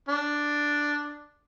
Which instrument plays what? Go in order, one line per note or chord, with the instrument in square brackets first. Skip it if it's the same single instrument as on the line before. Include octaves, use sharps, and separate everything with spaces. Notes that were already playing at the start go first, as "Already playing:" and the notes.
[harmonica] D4